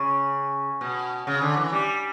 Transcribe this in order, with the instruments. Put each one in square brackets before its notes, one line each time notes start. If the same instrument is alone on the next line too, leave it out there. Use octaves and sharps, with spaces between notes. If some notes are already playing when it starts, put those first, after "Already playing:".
Already playing: [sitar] C#3
B2
C#3
D3
E3
G3